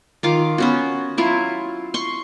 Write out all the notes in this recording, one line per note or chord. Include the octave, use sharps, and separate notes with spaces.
D#3 F4 D6
B3 C#4 F#4
F#3 E4 F4
C6 C#6